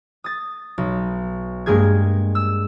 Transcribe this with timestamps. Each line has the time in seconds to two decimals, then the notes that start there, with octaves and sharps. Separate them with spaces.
0.24 D#6 A6
0.78 B1
1.66 G2 G#3 A#3 G#4 G#6
2.35 E6